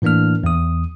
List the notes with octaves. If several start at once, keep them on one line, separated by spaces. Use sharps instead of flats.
A2 E3 A#3 D4 F6
E2 D#6